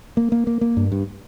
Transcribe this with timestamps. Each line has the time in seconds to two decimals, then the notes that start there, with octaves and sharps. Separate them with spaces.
0.17 A#3
0.32 A#3
0.47 A#3
0.61 A#3
0.77 G2
0.92 G2